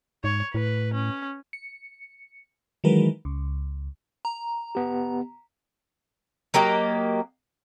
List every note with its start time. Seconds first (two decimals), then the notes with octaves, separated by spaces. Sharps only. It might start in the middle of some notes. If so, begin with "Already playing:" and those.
0.24 G#2 C#5
0.54 A2 B4
0.94 C#4
1.53 C#7
2.84 D#3 E3 F#3 G#3 A#4 B4
3.25 C#2
4.25 A#5
4.75 B3 G4
6.54 F#3 A#3 G4 D#5